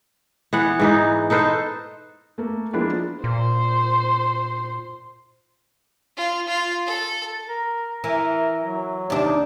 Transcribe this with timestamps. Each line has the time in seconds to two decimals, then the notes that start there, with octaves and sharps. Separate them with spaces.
0.53 E3 B3 F#5
0.80 G#2 E3 D#4
1.30 D#4 A4 B4 C5
2.38 A3 A#3
2.73 F3 G#3 A#3 B3 D4 E4
3.24 A#2 C5 C6
6.17 F4
6.48 F4
6.87 A4
7.49 A#4
8.04 E3 A#4
8.63 F#3
9.10 D#2 C3 D4
9.25 D#4